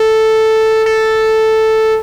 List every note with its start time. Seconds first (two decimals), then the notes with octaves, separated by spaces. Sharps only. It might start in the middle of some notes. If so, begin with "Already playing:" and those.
Already playing: A4
0.86 A4